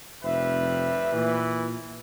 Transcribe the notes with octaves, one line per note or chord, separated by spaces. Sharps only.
F1 G3 C4 B4 E5
A#2 E3